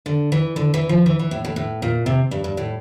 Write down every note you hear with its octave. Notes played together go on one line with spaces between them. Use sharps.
D3
E3
D3
E3
F3
E3
E3
A2
A2
A2
A#2
C3
G2
G2
A2